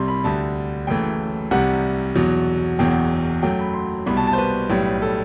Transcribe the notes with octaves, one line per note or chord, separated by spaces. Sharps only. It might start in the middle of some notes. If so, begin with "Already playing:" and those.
Already playing: C2 C3 G3 C6
B5
D2 D3 G3 A5
F#1 F#2 E3 A3 G5
C2 C3 G3 F#5
E2 B2 F#3
F#1 E2 B2 F#3 G5
F#2 F#3 A3 G5
B5
C6
C2 B2 G3 B5
A5
A5
C5
B4
B1 A2 G3
A4